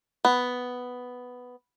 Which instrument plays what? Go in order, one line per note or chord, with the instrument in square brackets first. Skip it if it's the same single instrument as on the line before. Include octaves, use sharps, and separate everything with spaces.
[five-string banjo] B3